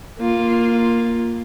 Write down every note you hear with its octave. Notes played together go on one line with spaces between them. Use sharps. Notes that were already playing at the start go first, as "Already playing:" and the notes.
A#3 F4